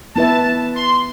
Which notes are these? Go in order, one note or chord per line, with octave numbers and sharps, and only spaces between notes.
B3 E4 B4 E5 A5
C6